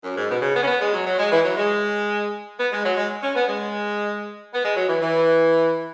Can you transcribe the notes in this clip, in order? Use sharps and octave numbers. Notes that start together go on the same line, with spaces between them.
F#2
G#2
B2
C#3
B3
C#4
B3
G#3
F#3
F#3
G#3
E3
F#3
G#3
B3
G#3
F#3
G#3
C#4
B3
G#3
B3
G#3
F#3
E3
E3